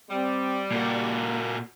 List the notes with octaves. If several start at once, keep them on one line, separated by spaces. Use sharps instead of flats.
G3 C4
A#2 A#3 F#4